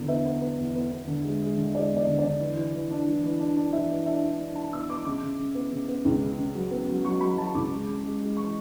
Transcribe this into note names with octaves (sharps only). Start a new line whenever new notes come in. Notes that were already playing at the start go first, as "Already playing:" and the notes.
Already playing: E2 D3
B3 E5
B3
B3
E2
B3
B3
D3
G#3
G#3
D3
G#3 D5
E2
D5
D3
D3 D5
E3
E3
E3
D4
E3
E3
D4
D4
E3 E5
E3
D4 E5
D4
D4
D4 A5
B3 E6
B3 D6
C#3 D6
C#3
C#3
B3
C#3
B3
C#2
C#3
C#3
F#3
B3
F#3
F#3 C#6
F#3 B5
F#3 A5
C#2 D6
G#3
C#3
G#3
G#3
E3 C#6